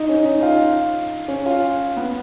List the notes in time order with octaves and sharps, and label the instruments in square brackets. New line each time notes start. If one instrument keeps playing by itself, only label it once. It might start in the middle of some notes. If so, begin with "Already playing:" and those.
Already playing: [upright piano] D#4
C#4
D#4
F4
C#4
F4
B3